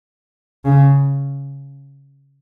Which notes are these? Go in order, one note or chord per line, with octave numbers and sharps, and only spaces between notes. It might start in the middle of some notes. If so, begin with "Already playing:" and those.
C#3